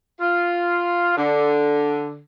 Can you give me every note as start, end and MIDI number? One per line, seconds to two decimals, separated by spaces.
0.21 1.17 65
1.17 2.18 50